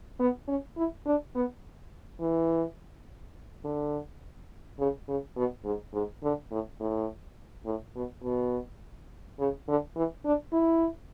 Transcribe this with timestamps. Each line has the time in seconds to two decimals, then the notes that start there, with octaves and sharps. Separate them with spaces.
0.20 B3
0.48 C#4
0.77 E4
1.06 D4
1.35 B3
2.20 E3
3.64 D3
4.79 C#3
5.08 C#3
5.36 B2
5.65 G#2
5.93 G#2
6.23 D3
6.51 A2
6.80 A2
7.66 A2
7.96 B2
8.23 B2
9.39 C#3
9.68 D3
9.96 E3
10.25 D4
10.53 E4